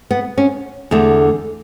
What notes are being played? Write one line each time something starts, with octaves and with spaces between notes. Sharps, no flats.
B3
C#4
E2 D3 A3